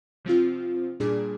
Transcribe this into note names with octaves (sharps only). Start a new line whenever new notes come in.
C3 F3 C4 F4
A#2 G3 D4 G#4